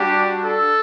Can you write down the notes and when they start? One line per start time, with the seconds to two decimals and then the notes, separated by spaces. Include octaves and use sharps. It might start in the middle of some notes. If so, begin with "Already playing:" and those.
Already playing: G3 D4 F#4 G4
0.44 A4